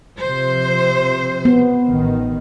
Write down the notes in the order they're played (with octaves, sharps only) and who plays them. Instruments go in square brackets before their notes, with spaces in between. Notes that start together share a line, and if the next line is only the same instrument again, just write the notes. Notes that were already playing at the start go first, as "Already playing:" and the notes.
[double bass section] C3 F3 [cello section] C5
[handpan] B3
[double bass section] A1 D#3